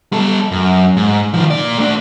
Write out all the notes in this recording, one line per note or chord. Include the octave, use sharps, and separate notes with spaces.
G3 A4
F#2
G#2
D#3 F3
A#2 D5
A3 D4